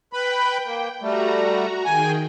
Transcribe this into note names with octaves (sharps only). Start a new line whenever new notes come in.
B4 G5 B5
A#3
G3 A3 F#4 A#5
D#3 G#4 G5 G#5